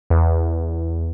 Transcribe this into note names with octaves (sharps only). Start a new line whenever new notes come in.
E2